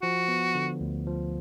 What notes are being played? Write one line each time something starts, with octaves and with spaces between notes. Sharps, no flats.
F3 F#4
B3
D3
D2
F3